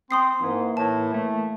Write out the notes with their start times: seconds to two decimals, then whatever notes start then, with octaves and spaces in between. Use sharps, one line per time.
0.11 C4 C6 D#6 C7
0.42 G#2 E3 A#3
0.77 A2 A5
1.14 A3